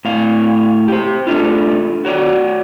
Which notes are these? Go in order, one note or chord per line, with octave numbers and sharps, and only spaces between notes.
A2 F5
G4 C5
A3 D4 F4
F#4 C#5 D5